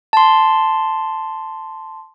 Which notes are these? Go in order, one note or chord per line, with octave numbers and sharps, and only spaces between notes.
A5 C6